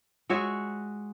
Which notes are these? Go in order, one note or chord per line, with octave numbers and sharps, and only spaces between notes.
G#3 F#4 C#5 E5